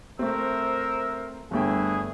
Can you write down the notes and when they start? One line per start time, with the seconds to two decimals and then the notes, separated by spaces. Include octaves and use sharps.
0.19 A3 C4 A#4 C5 E5 E6
1.51 G1 G3 A3 D4 E4 G#4 G5